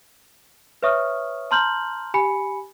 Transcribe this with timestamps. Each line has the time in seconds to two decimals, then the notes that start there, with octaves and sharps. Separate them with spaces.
0.83 B4 C#5 E5 C#6 D#6 F6
1.51 A5 A#5 C6 F6 G6 F#7
2.14 G4 G#5 B5 C#7